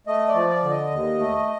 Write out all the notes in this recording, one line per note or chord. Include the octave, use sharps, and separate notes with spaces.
A3 D#5
D5
F3
D5
D3
D#5
D#2
A3